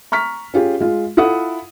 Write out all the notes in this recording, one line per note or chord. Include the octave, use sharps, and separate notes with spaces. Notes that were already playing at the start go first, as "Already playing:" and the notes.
A#5 C#6 F6 B6
C#4 F4 G4 G#4
G#3 F4
E4 F4 A4 E5 F#5 D#6